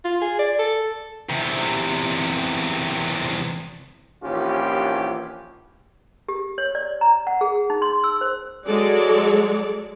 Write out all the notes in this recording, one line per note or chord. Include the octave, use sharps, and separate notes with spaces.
F4
G#4
D5
A4
E2 C3
A#1 D#2 E3 C#4 F4 G4
G4
C#5
D5
A#5
F#5
G#4
D#4
C6
E6
C5
F#3 G#3 A4 D5